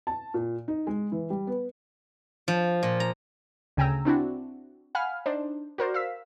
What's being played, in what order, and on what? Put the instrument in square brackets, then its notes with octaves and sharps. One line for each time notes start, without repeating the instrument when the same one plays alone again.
[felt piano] A5
A#2
D#4
G#3
E3
G3
B3
[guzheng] F3
A#2
A#5
[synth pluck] D2 C#3 G5 G#5 A#5 E6
C4 D4 E4 F#4
F5 F#5 G#5 B5 F6
D4 D#4 C5
F#4 A#4 C5 D5
F5 E6 B6